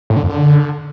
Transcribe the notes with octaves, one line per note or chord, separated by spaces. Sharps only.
A2
D3
F2
D3